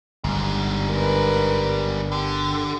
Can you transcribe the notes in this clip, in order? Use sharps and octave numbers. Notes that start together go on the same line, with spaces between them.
G1 G#2 G3
A#4 B4
D3 G4